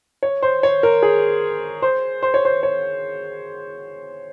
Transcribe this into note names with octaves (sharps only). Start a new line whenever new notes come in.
C#5
C5
C#5
A#4
G#4
C5
C5
C#5
C5
C#5